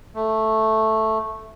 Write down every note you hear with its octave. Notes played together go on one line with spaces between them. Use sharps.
A3